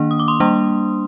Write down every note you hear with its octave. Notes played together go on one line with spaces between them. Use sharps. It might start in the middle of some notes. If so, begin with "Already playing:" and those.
Already playing: D#3 A#3 D4
D#6
D6
C6 D#6
G3 A#3 D4